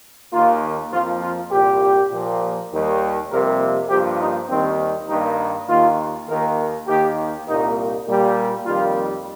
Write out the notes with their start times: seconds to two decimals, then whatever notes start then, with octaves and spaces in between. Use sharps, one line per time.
0.33 D#2 D#3 A#3 F4
0.92 F2 F3 A#3 F4
1.22 F4
1.51 C2 A#2 G3 G4
2.11 A#2 F3 A#3
2.71 D#2 D#3 G3
3.30 F2 C3 G3 A#3 A#4
3.90 G2 F3 A#3 G4
4.20 D#4
4.49 D#2 D#3 G3 C4
5.08 G2 D#3 G3 A#3 D#4
5.68 D#2 D#3 A#3 F4
6.28 D#2 D#3 A#3 A#4
6.87 D#2 D#3 A#3 G4
7.47 C2 A#2 G3 A#3 D#4
8.07 A#2 G3 A#3
8.66 F2 D#3 G3 A#3 F4